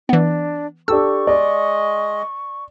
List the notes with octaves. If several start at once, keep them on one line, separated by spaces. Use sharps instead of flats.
E3 B3 D4
D4 G4 A4 C#6 E6
G#3 D5 D#5